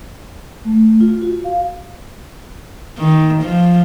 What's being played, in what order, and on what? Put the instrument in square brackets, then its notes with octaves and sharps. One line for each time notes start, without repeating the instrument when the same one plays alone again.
[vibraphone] A3
F4
F#4
F5
[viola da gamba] D#3
F3